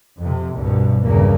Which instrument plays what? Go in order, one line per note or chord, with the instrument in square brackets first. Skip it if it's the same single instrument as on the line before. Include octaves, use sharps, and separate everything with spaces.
[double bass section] F2 C3
C2 G2 B2
B1 E2 G2 C#3 A#3